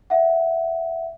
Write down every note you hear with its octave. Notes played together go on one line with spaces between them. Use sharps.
E5 F#5